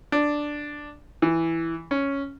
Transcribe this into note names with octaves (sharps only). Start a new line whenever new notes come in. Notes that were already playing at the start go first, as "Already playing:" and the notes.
D4
E3
C#4